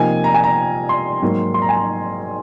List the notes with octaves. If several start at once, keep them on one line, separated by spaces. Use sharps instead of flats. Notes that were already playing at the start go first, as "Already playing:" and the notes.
Already playing: C3 F3 A#3 D#4 G#5
A#5
G#5
A#5
C6
G#2 F#3 A#3
C6
A#5
G#5
A#5